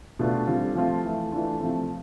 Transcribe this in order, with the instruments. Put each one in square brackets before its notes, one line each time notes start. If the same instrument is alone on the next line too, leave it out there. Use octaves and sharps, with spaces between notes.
[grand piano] B2 A3 D4 F4
D3 G3 C4 F4
F3 A3 C4 F4
E3 A3 E4
E3 A3 D4 F4
C3 F3 A3 C4